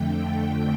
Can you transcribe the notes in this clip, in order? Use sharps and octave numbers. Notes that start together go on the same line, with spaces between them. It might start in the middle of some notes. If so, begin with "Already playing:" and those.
Already playing: F2 D3 A3 G5